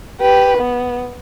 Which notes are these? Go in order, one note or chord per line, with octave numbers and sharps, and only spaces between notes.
G4 B4
B3